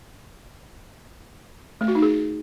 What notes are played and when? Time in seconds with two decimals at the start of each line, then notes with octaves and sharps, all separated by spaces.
1.81 A3
1.88 F#4
1.95 D#4
2.02 G#4